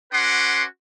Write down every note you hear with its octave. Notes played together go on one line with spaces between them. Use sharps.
C#4 F#4 B4 F#5 C6 D6